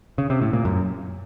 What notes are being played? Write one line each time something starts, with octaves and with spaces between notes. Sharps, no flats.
C#3
C3
A2
A#2
F#2